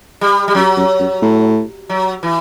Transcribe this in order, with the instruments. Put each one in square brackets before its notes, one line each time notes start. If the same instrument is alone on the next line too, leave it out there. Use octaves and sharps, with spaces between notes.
[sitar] G3
G3
[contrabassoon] F#2 [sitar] F#3
[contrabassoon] F#2
F#2
A2
[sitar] F#3
E3